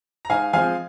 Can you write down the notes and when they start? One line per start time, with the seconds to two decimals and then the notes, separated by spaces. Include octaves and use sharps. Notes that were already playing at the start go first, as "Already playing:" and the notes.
0.25 A#5
0.30 G#2 F5 G#5
0.53 F3 G#3 C4 F5 G#5